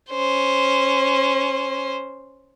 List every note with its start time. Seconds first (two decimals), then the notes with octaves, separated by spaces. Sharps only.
0.11 C#4 C5